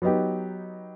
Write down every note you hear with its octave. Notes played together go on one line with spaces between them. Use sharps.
F#3 B3 D#4 G4